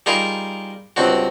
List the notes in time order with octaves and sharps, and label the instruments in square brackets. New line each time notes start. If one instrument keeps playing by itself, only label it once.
[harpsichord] G3 D#4 F4 G#4 A#4
C#2 G2 C4 F#4